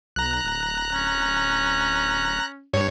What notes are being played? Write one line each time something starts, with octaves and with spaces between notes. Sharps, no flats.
B1 A#5 F#6
D1
C#4
G2 C#5